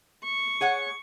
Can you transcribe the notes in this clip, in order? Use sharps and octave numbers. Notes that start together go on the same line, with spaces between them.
C#6
G#4 C#5 F#5